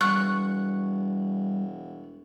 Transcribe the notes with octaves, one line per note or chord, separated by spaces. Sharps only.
E1 G3 C#6 F#6